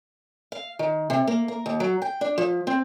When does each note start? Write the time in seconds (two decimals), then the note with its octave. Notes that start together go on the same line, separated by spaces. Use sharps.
0.52 F5
0.79 D#3
1.10 C3
1.27 A#3
1.48 A#4
1.66 D#2
1.80 F#3
2.02 G5
2.21 D4
2.38 F3
2.67 C4